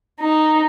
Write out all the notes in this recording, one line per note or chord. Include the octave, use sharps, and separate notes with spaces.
D#4